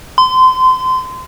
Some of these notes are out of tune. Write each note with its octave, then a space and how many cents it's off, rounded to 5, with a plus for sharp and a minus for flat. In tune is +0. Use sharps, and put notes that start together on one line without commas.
C6 -30